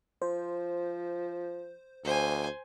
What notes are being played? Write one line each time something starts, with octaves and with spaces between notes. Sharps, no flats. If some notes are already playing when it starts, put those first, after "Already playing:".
F3 C5
D2 C5 G#5